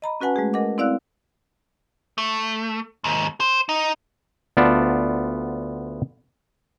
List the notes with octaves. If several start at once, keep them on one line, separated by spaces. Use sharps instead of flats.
D#5 A#5 B5
C#4 F#4 B4 F#5 G#5 A5
G#3 A3 G#4
A#4 D#5 F#5 D6
C4 E4 D5 F5 E6 F#6
A3
D#2 G#2
C5
D#4
D2 B3 F4 D5 A5